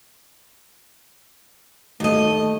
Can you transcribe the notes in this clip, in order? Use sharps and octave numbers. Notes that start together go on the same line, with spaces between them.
D#2 A3 D#5